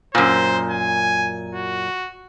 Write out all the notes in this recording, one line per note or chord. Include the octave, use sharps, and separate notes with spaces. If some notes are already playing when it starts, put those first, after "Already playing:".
F#2 A#2 C5
G#5
F#4